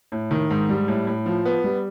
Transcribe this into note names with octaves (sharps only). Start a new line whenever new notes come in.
A2
D#3
G#2
G3
A2
A2
F3
B3
G3